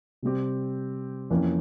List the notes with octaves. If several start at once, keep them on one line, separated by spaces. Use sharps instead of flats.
C3 G3 C4 G4
F2 E3 A#3 C#4